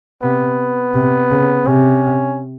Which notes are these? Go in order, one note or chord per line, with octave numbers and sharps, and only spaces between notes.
C3 B3
C3
C#3
C3 C#4